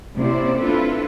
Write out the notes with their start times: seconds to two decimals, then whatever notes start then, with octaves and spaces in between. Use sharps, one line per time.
0.17 C3 A#3 C#4 E4 C5 D5
0.62 C4 D4 E4 F4 A4 B4